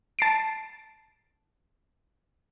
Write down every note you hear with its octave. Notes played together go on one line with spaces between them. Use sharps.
A5 C7 D7